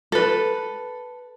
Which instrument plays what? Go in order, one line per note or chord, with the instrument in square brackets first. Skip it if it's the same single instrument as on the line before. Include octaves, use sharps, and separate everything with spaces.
[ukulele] A4 B4